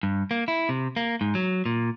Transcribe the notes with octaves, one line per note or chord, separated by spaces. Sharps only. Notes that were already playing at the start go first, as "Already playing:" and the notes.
G2
A#3
E4
C3
A#3
G#2
F#3
A#2